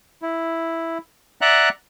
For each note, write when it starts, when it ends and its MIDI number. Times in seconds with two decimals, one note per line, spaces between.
0.22 0.98 64
1.41 1.69 74
1.41 1.69 76
1.41 1.69 78
1.41 1.69 82
1.41 1.69 90